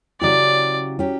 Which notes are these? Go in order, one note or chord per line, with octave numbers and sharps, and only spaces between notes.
C#3 F#3 C#4 E4 G4 D5
F#3 C#4 G4